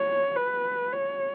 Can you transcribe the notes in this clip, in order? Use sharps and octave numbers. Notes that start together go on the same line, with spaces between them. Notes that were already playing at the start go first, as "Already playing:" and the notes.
Already playing: C#5
B4
C#5